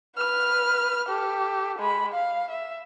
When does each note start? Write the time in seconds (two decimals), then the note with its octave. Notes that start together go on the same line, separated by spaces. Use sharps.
0.16 B4 F6
1.08 G4 A4
1.79 G#3 B5
2.13 F5
2.50 E5